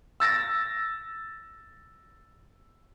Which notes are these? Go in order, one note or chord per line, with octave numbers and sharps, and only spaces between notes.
E6 A6 A#6